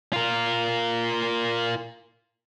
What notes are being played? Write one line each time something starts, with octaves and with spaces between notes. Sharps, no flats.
F4 A#4